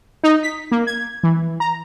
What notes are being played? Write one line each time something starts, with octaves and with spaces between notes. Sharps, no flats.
D#4
B6
A#3
G#6
E3
A#5